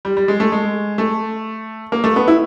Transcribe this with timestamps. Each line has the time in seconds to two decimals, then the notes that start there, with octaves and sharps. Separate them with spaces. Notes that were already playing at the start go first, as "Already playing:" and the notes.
0.05 G3
0.17 G3
0.28 G#3
0.40 A3
0.52 G#3
0.98 A3
1.92 A#3
2.04 A3
2.16 B3
2.28 E4